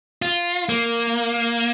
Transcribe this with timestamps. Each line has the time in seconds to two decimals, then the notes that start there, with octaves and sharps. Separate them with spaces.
0.22 F4
0.69 A#3